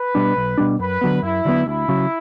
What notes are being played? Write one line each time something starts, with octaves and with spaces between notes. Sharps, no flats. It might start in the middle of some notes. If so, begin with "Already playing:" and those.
Already playing: B4
B2 G3 D4
B1
B2 G3 D4
F#2 B4
D3 F#3 B3
F#2 E4
D3 F#3 B3
D2 E4
C#3 F#3